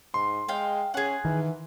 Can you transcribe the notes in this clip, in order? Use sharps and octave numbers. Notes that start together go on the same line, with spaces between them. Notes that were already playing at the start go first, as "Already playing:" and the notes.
G#2 C6
G#3 F5 G5
C#4 G#4 F#5
D#3 E3